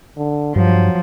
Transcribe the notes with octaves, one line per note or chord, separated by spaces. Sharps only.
D3
G2 F3 F#3